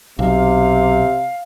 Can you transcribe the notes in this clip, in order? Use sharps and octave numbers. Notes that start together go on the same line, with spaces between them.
B1 C3 F5